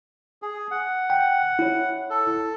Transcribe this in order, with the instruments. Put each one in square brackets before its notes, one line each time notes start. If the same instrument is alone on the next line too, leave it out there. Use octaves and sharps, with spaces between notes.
[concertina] G#4
F#5
[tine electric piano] G5
E4 C#5
[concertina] A4